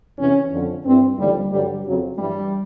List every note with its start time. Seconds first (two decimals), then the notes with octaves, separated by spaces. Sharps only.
0.19 E2 C3 E3 C#4
0.52 F2 D3 F3
0.85 G2 E3 C4
1.18 D#2 D3 F3 G3
1.51 G2 D3 F#3 G3
1.86 F2 C#3 F#3
2.18 G2 E3 G3